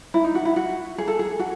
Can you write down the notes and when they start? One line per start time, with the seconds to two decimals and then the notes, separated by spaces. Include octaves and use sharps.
0.14 E4
0.24 D#4
0.35 F#4
0.45 E4
0.56 F#4
0.98 G#4
1.08 A4
1.19 G#4
1.39 F#4